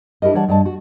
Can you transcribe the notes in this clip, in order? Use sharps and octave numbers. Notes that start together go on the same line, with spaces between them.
D4 E4 G4 A#4 D#5
E3 G3 C#5 D5 F#5 A5
G2 D5 D#5 A5
F#4